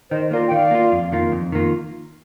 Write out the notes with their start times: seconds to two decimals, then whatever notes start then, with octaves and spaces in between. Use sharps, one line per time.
0.11 D#3 C5 D#5
0.31 A#3 F4 A#4 D5
0.48 G5
0.51 D#3 D5 F5
0.71 A#3 F4
0.92 F2
1.12 D#3 A#3 F4
1.32 F2
1.52 D#3 A#3 F4